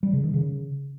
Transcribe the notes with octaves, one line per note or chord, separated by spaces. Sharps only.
G3
C#3
D#3
C#3